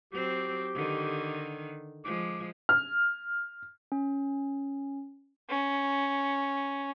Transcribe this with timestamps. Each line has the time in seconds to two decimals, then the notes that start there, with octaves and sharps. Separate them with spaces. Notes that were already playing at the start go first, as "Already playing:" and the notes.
0.13 F#3 C4 G4
0.75 D3 D#3
2.05 F3 G#3 D6
2.69 F6
3.92 C#4
5.49 C#4